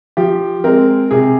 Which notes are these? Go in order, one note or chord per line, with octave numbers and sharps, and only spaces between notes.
F3 G4
G#3 C4 A#4
C3 G#4